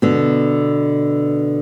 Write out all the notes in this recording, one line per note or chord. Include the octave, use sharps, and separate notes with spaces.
B2 D3